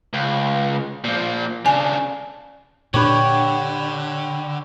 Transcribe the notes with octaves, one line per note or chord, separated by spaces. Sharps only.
C#2
A#2 F3
C#3 D4 G#5
A#2 D3 D4 G4 B4 C#5